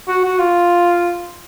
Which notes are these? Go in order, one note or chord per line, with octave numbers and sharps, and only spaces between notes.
F#4
F#4
F4